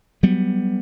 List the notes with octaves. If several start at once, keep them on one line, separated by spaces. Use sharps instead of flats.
F#3 G3 B3